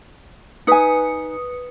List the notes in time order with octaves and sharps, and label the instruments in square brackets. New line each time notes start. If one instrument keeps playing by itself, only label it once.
[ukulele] D#4 G#5 [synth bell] B4 D#6 C#7